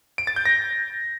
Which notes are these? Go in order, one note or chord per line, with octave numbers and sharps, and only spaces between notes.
D7
A6
G6
A#6